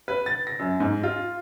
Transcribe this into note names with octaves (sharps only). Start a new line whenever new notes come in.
B4
A6
A#6
F#2
G#2
F4